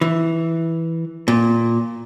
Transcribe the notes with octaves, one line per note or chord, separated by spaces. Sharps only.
E3
A#2